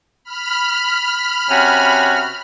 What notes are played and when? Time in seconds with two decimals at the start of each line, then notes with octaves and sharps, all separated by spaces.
0.24 B5 F6
1.50 C3 C#4 F#4